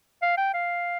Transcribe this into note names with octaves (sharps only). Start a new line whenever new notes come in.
F5
G5
F5